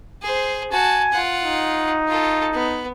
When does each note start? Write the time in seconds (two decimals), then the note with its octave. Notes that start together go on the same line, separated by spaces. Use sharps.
0.22 G#4 C5
0.72 F#4 G#5 A5
1.12 F4 F#5
1.43 D#4
2.08 F4 A4
2.53 B3